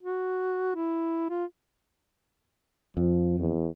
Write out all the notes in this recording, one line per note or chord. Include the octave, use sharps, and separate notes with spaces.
F#4
E4
F4
F2 F3
E2